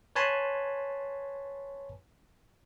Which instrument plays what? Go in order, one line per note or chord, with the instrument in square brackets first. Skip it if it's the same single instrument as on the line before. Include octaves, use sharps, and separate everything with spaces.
[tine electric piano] B4 C#5 G#5 A5 B5 C6